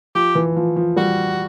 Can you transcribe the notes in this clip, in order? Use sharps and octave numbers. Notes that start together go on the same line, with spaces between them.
F3 G4
E3
F3
F3
G3 F#4